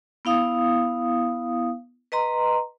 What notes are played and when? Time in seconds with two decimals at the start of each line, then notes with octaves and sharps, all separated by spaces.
0.25 B3 E4 F5 D#6
2.12 B4 D#5 A#5 C6